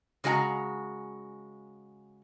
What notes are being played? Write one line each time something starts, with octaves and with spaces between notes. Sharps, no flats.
C#3 G#3 F#4 G#5 A#5